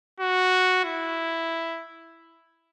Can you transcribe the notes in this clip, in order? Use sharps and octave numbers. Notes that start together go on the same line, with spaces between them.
F#4
E4